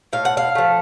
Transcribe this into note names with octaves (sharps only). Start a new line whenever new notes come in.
A2 F5
F#5
F5
F3 A3